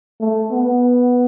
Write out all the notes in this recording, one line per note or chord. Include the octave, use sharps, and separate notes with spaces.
A3
B3